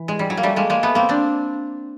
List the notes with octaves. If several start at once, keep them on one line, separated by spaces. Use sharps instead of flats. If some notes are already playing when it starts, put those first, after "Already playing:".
Already playing: E3
G#3
G3
F#3
A#3
G3 A3
G#3 A#3
G#3 A#3
A3 B3
A#3 C4
C4 D4